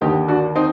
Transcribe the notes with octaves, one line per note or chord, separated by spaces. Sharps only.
D#2 D3 D#4 G4
D4 F#4
C4 D#4